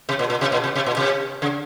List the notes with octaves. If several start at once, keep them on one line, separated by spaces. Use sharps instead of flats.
C3
A#2
A#2
C3
A#2
C3
C3
A#2
C3
C#3